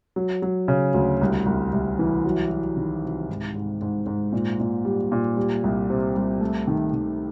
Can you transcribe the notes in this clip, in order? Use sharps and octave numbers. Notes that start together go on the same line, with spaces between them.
F#3
F#3
C#3
D2
C2
C2
C2
E3
F#3
F#3
D#3
C3
G#2
G#2
G#2
G#2
A#2
A#2
G3
A#2
G3
C2
C3
C2
A3
D#3
D#3